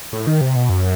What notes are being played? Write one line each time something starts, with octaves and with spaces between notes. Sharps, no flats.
A2
D#3
C3
B2
F#2